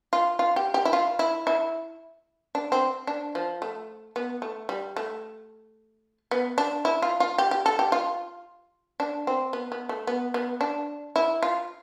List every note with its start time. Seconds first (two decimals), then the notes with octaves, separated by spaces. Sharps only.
0.13 F4
0.39 F4
0.56 G4
0.74 G4
0.85 E4
0.93 F4
1.19 E4
1.47 E4
2.55 D4
2.72 C4
3.07 D4
3.35 F3
3.62 A3
4.16 B3
4.42 A3
4.69 G3
4.97 A3
6.31 B3
6.58 D4
6.85 E4
7.02 F4
7.20 F4
7.38 G4
7.51 G4
7.66 A4
7.79 G4
7.92 F4
9.00 D4
9.27 C4
9.53 B3
9.72 B3
9.89 A3
10.07 B3
10.34 B3
10.61 D4
11.16 E4
11.43 F4